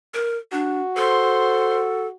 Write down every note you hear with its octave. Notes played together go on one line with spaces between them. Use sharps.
A#4
D4 F#4
A4 C5 C6